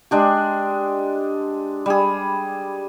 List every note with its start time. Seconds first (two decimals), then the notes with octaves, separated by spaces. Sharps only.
0.11 G#3 D4 G4
1.86 G3 G#4